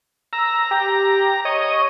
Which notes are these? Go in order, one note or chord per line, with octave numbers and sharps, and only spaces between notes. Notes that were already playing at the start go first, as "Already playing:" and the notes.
A#5 E6
G4
C#5 D#5